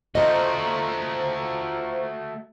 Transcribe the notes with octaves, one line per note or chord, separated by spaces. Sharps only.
A3 F4 F#4 C5 D#5 A#5